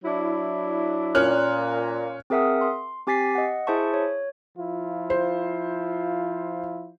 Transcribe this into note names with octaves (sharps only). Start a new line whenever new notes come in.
F#3 D4 E4
A#2 C#4 F6 F#6
C4 G#4 A#4 E5 F#5 D#6
C6
C4 G4 G#5 A6 B6 C7
D#5 F#5
E4 G#4 C5 E5 A5 C#6
C#5
F3 E4 F4
C5